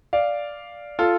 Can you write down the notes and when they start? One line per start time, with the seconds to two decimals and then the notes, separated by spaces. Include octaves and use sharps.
0.13 D5 F5
0.99 F4 A4